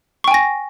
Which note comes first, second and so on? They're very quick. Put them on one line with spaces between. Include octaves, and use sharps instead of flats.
C#6 G5 G#5 A#6